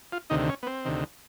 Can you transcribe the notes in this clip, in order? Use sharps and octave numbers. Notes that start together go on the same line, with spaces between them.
F4
D2 C3 D#3 D#4
C#4
B3
C4
D2 C3 D#3